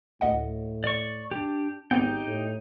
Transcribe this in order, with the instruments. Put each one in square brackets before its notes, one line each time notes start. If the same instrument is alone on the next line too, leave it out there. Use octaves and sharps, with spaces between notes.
[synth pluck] D2 D#5 F#5 [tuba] A2
[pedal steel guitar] D5 C#6
D4 G4
[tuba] G#1 [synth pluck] B3 C4 [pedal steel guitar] D#4 G4 G5
[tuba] A2